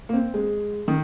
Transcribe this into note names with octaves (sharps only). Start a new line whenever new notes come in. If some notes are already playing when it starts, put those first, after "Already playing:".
A#3
C4
G#3
D#3